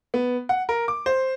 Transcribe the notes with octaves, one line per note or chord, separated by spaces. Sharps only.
B3
F#5
A#4
D6
C5